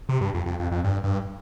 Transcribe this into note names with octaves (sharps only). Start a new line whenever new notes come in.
C3
G2
F2
F2
F2
F2
G2
G2